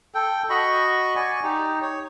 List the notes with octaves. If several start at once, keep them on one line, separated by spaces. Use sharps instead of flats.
A4 G5
F#4 D#5 B5 C#6
D5 G#5 C#6
D#4 G4
C#5